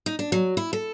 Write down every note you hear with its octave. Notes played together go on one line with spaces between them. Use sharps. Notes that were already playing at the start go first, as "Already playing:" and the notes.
D#4
D4
F#3
E4
A4